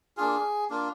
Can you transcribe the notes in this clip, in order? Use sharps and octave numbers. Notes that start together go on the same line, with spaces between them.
A#3 D4 F4 G#4
A#3 D4 F4